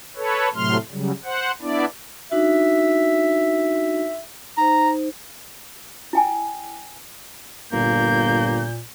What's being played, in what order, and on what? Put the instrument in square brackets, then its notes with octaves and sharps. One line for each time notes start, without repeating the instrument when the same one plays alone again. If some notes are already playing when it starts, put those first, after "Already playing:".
[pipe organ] A4 B4 C#5
A2 C3 F#3 A3 C6 F6
C#3 F#3 G3
C5 F#5
B3 D4 E4 D5
[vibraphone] D4 D#4 F#4 [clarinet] E5
[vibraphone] D#4 C5 [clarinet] A#5
[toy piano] E4 G5 G#5
[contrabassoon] G1 [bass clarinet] A#2 [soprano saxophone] A#3 [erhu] G6